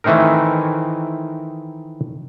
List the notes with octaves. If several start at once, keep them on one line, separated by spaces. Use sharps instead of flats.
D#3 E3 A3 C4 D#4 A#4